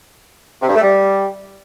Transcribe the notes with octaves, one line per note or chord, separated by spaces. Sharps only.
C3
G2
A3
G3